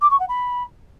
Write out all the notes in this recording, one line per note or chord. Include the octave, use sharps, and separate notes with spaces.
D6
C#6
F#5
B5